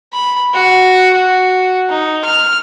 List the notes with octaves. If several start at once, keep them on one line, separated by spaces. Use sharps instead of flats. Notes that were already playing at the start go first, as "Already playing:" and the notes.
B5
F#4
F#4
D#4
F6